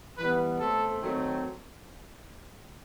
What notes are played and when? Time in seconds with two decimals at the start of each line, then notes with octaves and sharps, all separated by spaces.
0.18 E3 G3 B3 B4
0.60 B2 A3 C4 A4
1.01 D#3 F#3 A3 C4